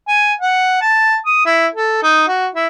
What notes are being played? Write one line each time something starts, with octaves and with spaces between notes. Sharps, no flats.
G#5
F#5
A5
D#6
E4
A4
D#4
F#4
E4